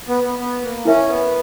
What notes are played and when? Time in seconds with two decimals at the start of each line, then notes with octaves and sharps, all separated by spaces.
0.08 B3
0.24 B3
0.39 B3
0.62 A#3
0.85 C#4 E4 A#4 E5
1.09 B3